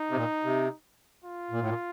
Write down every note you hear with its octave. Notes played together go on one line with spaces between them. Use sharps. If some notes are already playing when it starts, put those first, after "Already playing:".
Already playing: D#4
C3
A#2
C3
F4
A#2
A2
A#2